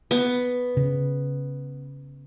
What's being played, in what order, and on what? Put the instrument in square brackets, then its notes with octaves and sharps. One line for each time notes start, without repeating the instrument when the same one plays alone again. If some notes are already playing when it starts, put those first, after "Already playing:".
[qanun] B3
[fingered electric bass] C#3